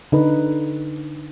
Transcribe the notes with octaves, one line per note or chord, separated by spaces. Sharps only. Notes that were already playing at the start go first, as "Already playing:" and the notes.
D3 D#4 B4